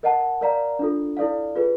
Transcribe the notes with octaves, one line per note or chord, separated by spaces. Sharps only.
A#4 D#5 F#5 A5
A#4 D5 F5 A#5
D4 F4 A4
E4 A4 D5 F5
F4 G#4 B4